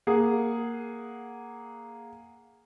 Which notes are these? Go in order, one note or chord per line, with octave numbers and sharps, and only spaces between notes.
A#3 G#4 F#5